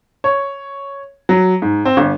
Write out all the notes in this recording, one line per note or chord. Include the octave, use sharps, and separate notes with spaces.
C#5
F#3
G#2
C4
G1